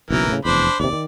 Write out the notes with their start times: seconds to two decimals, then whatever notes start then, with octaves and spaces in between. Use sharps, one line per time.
0.10 F#1 B1 F#2 E3 A#4
0.29 A2 C#3
0.45 F1 E2 D4 C5 B5
0.80 D#2 C3 D5
0.93 D#3